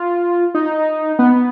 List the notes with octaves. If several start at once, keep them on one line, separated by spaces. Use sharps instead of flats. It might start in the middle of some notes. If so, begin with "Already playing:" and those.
Already playing: F4
D#4
B3